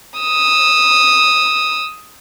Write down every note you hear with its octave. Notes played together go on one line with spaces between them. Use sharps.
D#6 E6